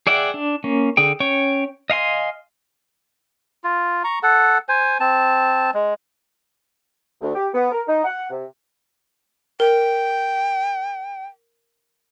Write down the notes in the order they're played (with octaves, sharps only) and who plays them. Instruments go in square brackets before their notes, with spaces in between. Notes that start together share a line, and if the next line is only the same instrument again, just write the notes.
[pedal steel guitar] G#4 D5 E5 F#5 G5
D4
A#3 C#4
D3 G#4 G5
C#4 C#5 G5 C#6
D#5 F5 G#5 C6
[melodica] F4
A#5 C#6
A4 F#5
C5 G#5
C4 A5
G#3
[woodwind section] D2
G4
B3
A#4
D#4
F#5
C3
[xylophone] A#4 [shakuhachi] G5